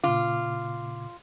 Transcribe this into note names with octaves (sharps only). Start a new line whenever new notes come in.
A#2 C#3 F4 D6